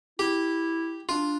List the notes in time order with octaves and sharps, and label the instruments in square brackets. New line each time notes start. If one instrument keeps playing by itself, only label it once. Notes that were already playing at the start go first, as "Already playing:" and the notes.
[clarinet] E4 [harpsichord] G4
[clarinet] D4 [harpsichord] F4